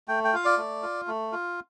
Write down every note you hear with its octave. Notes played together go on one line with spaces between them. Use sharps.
A3 G5
G5
F4 F5
D5
A3
F4
A3
F4